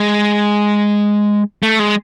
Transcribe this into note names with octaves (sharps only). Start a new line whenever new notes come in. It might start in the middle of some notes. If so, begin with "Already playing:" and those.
Already playing: G#3
A3
G#3